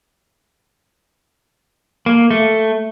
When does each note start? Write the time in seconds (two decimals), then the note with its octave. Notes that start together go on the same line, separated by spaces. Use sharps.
2.06 A#3
2.31 A3